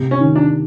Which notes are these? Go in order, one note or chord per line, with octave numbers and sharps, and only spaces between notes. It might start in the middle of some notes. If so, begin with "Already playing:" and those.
Already playing: C3
C#4
D#3
D4